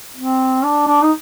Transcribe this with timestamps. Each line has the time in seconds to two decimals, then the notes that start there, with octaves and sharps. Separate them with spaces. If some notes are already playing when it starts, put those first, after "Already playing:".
0.17 C4
0.64 D4
0.87 D4
1.02 D#4